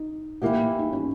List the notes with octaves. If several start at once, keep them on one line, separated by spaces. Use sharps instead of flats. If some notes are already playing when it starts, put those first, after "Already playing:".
Already playing: D#4
E3 A#3 E4 G4
D#4
C#4